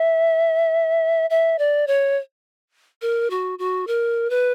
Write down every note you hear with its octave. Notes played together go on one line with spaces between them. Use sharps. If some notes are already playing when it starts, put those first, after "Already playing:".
Already playing: E5
E5
D5
C#5
A#4
F#4
F#4
A#4
B4